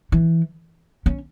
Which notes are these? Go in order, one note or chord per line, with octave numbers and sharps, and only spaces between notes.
E3
C#4